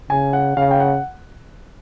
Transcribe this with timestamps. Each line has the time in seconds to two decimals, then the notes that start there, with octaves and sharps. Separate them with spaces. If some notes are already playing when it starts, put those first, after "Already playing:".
0.10 C#3 G#5
0.33 F#5
0.57 C#3 F5
0.71 G5
0.80 F#5